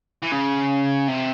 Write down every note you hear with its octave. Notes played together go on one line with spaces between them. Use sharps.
E3
C#3
C3